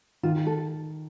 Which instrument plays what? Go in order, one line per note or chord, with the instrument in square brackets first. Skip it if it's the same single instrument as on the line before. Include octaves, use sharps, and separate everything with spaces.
[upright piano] D#3 [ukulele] F4
[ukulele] A4